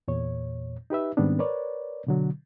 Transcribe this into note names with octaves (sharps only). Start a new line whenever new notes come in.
E2 A#2 C#5
D#4 G4 B4 E5
G#2 D#3 G3 B3 C4 D4
A#4 B4 C#5 D5
B2 D3 F#3